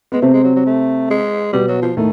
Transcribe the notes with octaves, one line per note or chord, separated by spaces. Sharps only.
G#3 B3
C3 A3 C4
G#3
F#3
F#3
A3
G#3
B2 G3 B3
F#3
F3
A2 D#3 A3